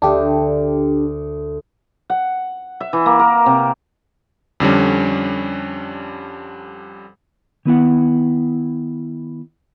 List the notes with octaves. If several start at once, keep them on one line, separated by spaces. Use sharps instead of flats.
D2 D4 G4
F#5
E5
E3
A#3
A#4
C3
F2 D3 G3 C#4
D#3 B3 E4 F#5